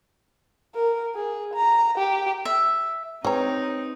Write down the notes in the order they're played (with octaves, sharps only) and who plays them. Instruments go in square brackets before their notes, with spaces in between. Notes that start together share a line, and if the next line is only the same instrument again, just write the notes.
[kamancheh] A#4
G#4
A#5
G4
[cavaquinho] E5
[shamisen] G#3 A#5 [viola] C4 D#4 [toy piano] B4 G5 [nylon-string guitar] C#5